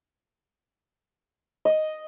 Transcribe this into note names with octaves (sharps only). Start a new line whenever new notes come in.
D#5